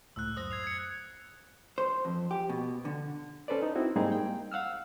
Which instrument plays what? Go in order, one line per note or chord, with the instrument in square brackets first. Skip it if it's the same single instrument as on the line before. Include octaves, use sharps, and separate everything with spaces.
[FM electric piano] C#2 A2 [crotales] E6 F#6
[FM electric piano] F#2 C5 A#6 [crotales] D#6
[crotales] G#6 C7 F7
G#6 C#7
[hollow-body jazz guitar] C5
F2
G4
B2
D3
[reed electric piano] C#4 A4 B4 C5 D5
D#4
C4 E4 F#4
G#2 G3 A#3 C4 D#4 G#4
G5
F5 F#5 E6 F6